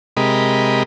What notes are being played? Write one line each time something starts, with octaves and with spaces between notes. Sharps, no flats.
C3 G#3 G4 A#4 D#5 B5